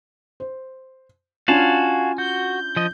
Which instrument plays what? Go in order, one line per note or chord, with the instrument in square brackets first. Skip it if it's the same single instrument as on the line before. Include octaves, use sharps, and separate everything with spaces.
[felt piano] C5
[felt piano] C#4 D4 F4 [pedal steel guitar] F#4 F5 A5 [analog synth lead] G#5
[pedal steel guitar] F#4 [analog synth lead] G6
[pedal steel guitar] F3 D#5